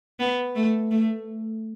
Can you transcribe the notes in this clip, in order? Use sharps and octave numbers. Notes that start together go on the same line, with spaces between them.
B3
A3
A3